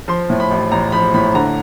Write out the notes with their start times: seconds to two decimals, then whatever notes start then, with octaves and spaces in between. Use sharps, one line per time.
0.08 F3 C6
0.30 A2
0.40 B5
0.51 A1
0.72 A1 A#5
0.92 F3 B5
1.14 A2 B5
1.35 D3 A#5